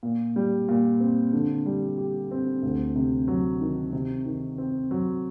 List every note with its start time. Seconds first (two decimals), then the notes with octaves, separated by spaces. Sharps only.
0.03 A#2
0.36 G3
0.69 A#2
1.00 C4
1.33 D3
1.66 G3
1.98 G4
2.31 C4
2.62 D2
2.96 C3
3.28 F#3
3.61 D#3
3.93 C3
4.26 D#3
4.58 C4
4.91 F#3